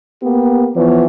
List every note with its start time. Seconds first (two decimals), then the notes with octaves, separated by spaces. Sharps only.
0.23 A#3 B3 G4
0.76 E3 F3 B3 C#5